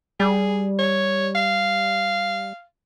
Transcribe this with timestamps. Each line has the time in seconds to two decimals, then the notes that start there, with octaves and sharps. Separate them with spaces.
0.20 G3 G#4
0.79 C#5
1.35 F5